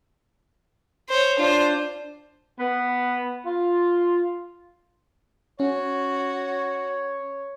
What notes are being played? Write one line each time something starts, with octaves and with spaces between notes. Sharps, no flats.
C5 C#5
D4 F4 C5
B3
F4
C#4 F#4 C#5